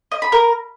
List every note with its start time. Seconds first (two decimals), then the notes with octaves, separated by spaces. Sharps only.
0.12 D#5
0.22 B5
0.32 A#4